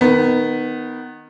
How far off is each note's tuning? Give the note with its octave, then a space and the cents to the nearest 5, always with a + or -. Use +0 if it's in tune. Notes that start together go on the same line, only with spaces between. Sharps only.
D#3 -5 B3 +10